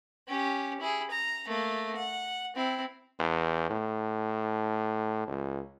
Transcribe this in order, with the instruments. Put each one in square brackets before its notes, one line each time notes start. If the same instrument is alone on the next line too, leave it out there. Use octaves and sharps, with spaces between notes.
[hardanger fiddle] C#4 G4
E4 G#4
A#5
A3 A#3
F#5
C4 E4
[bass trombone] E2
A2
C#2